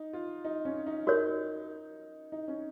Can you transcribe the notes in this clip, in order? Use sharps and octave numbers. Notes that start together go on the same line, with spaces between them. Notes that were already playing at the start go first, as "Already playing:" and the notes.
Already playing: D#4
F4
D#4
C#4
D#4
D#4 F#4 A#4 C#5
D#4
C#4